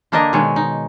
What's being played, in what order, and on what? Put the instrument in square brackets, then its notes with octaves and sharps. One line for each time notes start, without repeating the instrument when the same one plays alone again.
[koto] D3 A#3 D4 A#4 D#5
B2 D#3 G#3 C#5
D#4